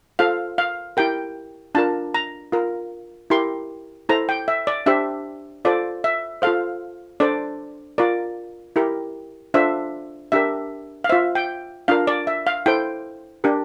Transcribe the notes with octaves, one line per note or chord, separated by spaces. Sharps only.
F4 A4 C5 F5
F5
E4 G4 A#4 G5
D4 F4 A#4 A5
A#5
F4 A#4
E4 G4 A#4 C6
E4 A4 C5 A#5
G5
E5
D5
D4 G4 C5 E5
F4 A4 C5 D5
E5
F4 A4 C5 F5
D4 A4 C5 D5
F4 A#4 D5
E4 G4 A#4
D4 F4 A4 C5 E5
D4 G4 A#4 E5
F5
F4 C5 E5
G5
D4 F4 A#4 F5
D5
E5
F5
E4 A4 C5 G5
D4 G4 A#4